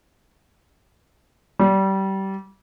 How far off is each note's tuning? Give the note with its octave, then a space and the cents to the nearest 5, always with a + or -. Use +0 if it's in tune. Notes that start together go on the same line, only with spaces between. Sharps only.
G3 -25